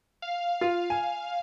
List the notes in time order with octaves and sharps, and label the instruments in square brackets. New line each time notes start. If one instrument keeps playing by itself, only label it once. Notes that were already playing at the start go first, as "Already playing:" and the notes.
[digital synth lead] F5
[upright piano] F4
G#5